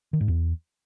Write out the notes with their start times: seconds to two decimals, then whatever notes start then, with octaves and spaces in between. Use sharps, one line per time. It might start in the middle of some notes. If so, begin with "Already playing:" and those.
0.13 D#3
0.21 G#2
0.28 E2